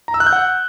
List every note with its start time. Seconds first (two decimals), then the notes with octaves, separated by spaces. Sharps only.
0.08 A#5
0.14 E6
0.20 F#6
0.26 G6
0.33 F#5